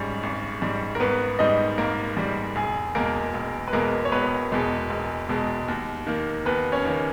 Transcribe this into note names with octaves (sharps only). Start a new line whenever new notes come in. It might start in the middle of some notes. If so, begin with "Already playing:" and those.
Already playing: G#1 G#2 G3 C#4
G#1
G#2 G3
A#4
G#1 B3 B4
G#2 G3 D#4 D#5
G#1 A#3 A#4
G#2 G3
E1 G#4
E2 B2 G#3 A#3 A#4
E1
B4
E2 B2 G#3 A#3 A#4
C#5
E1 B3 B4
E2 B2 G#3
E1
E2 B2 G#3
D#2
D#3 A#3
D#2 B3 B4
C#4 C#5
D#3 A#3